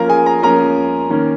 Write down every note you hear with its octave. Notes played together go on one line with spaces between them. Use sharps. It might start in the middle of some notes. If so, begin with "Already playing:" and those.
Already playing: F3 A#3 C#4 F4 A#4 F5 A#5
G#4 G#5
A#4 A#5
F3 A#3 C#4 A#4 A#5
D#3 A#3 C#4